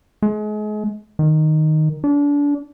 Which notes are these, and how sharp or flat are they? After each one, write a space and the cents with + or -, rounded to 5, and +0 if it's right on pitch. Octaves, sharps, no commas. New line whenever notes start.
G#3 +35
D#3 -5
D4 -30